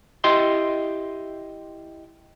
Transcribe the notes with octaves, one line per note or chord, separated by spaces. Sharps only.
E4 G4 D#5 C6